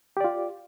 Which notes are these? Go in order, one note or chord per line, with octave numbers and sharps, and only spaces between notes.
F4 G4 D5